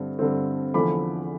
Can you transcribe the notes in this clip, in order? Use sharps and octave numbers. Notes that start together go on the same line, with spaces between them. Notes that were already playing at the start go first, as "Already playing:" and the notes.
Already playing: G2 D3 A3 C4
G2 D3 A3 C4
E2 D3 F3 A3 B5 D6